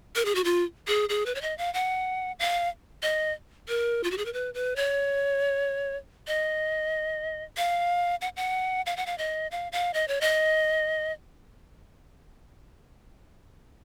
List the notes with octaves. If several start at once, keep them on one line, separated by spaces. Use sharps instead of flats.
A#4
G#4
F#4
F4
G#4
G#4
B4
C#5
D#5
F5
F#5
F5
D#5
A#4
F4
F#4
G#4
A#4
B4
B4
C#5
D#5
F5
F#5
F#5
F5
F#5
F5
D#5
F5
F5
D#5
C#5
D#5